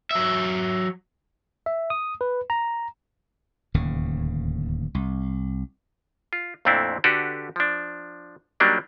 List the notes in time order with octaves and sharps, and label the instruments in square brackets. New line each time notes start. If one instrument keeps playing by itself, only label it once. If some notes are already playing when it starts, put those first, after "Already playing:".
[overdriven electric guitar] F#3 E5
[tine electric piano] E5
D#6
B4
A#5
[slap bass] D1 D#2 C#3
C2
[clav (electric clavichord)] F4
F2 A#2 A3 C4 D4 E4
D3 D4 F#4 G4 A4 B4
F3 D4
F#3 G3 A#3 D4 D#4